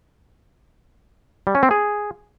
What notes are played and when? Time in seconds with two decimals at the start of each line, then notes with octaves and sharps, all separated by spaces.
1.47 G3
1.55 C#4
1.63 C4
1.71 G#4